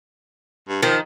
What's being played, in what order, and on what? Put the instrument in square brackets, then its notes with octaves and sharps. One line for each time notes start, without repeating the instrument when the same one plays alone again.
[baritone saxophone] G2
[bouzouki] D#3 [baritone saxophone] F3